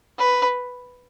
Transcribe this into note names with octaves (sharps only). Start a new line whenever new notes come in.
B4